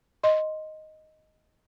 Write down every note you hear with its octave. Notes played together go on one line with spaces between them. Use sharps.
D#5 C6